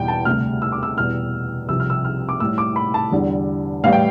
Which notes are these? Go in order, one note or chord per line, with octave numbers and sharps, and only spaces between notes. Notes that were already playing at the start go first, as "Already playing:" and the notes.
Already playing: E2 B2 G3 G5
A5
D2 C3 G3 F6
E6
D6
E6
E2 B2 G3 F6
C2 C3 F3 E6
F6
E6
F6
D6
A2 G3 E6
D6
B5
A5
E2 D3 G3
A2 E3 G3 F5
G5